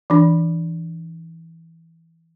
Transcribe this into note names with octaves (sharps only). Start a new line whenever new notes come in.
E3 D4